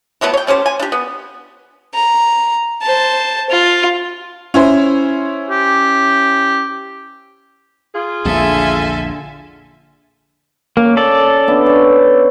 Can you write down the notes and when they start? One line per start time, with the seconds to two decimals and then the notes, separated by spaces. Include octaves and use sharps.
0.21 E3 F#3 A3 B3
0.33 C#5 G5
0.47 A3 C#4 G4 C5
0.66 G#5
0.80 D4 G4
0.92 B3
1.94 A#5
2.82 C5 A5
3.50 F4
4.54 C#4 E4 C5
5.50 G4
7.95 F4 G#4
8.25 A#1 E2 D3 A4 E5 G#5
10.77 A#3 C#4
10.97 A4 D5
11.48 B3 D4 E5
11.66 C#4 A5